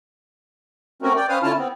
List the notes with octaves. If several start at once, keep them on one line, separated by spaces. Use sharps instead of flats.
A3 C4 C#4 F#4 A#4
D5 G5
C#4 B4 C5 F5 D#6 F6
D3 C#4 E4 F4 A5 F6
B3 C4